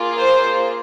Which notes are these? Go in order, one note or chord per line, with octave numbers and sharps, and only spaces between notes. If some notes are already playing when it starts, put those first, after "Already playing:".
Already playing: A#3 F4 G#4
C5